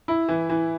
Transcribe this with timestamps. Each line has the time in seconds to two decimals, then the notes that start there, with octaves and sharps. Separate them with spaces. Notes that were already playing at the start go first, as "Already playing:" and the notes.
0.08 E4
0.28 E3
0.50 E3